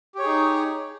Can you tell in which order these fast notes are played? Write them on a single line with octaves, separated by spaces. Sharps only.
G4 C#5 G#4 D#4